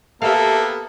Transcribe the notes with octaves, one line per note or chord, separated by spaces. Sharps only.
A#3 B3 G4 A4 E5 F5